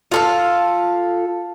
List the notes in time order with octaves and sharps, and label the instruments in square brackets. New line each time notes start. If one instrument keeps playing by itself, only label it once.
[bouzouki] F4 A4 F5